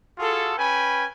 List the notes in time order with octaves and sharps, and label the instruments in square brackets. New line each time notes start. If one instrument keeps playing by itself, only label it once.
[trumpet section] F4 F#4 G#4 A4
C#4 B4 G5 G#5 B5